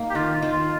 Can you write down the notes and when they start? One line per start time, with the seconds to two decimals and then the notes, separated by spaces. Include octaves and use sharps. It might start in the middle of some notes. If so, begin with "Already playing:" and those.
Already playing: A#3 D#4
0.10 G4
0.15 D#3 F4
0.34 F4
0.42 D#3
0.52 F4